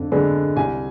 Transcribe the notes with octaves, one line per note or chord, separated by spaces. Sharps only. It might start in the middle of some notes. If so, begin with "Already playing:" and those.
Already playing: F2 D3
D3 G#3 B3
C2 G#5